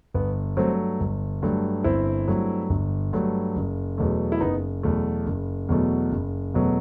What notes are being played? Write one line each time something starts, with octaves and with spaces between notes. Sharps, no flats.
G1 B3
G2 F#3 A3 C4
G1
G2 F#3 A3
G1 C4 E4
G2 F#3 A3
G1
G2 F#3 A3
F#1
E2 B2 F#3 A3
E4
F#1 B3 D#4
E2 B2 F#3 A3
F#1
E2 B2 F#3 A3
F#1
E2 B2 F#3 A3